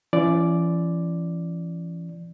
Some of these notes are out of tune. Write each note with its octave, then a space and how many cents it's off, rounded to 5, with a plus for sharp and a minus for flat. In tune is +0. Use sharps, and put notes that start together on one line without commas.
E3 +40 C#4 +0 D5 +0